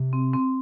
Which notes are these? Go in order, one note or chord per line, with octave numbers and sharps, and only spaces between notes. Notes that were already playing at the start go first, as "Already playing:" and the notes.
Already playing: C3
C4
C4